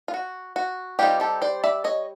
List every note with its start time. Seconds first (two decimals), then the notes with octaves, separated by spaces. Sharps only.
0.08 F4
0.14 F#4
0.56 F#4
0.99 G3 C4 D#4 F4 G4
1.20 G4 A4
1.42 C5 D5
1.64 D5 E5
1.84 C#5 D#5